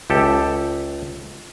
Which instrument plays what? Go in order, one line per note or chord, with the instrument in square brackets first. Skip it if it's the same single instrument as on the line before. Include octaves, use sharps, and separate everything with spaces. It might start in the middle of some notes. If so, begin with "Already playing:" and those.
[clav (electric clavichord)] C#2 G4 A4 E5